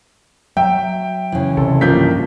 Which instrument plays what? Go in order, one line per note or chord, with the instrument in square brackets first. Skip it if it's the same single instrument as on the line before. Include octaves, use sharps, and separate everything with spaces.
[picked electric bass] F#3 [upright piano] E5 [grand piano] G5
[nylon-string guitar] C#3 E3
[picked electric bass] C2 C3 [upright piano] A4
[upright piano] A1 F3 A#3 [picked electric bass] G2 [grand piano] G6 B6